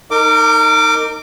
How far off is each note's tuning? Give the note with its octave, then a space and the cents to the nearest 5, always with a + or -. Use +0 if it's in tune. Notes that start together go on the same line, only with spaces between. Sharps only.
D#4 +0 A#4 -30 D6 +0